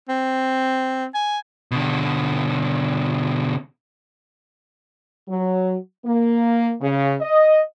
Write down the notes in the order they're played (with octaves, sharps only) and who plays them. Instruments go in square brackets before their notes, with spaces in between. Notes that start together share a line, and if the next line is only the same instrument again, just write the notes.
[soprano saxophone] C4
G#5
[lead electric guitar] B2 D3
[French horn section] F#3
A#3
C#3
D#5